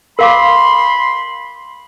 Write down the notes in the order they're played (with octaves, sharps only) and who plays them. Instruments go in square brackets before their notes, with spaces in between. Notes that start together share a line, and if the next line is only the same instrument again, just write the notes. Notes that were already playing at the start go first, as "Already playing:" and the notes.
[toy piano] A#4 F5 D6 [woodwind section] B5 C6